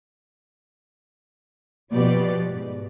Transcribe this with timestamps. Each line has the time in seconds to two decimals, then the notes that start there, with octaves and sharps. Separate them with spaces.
1.92 B2 F3 G4 B4 D5
2.48 G#2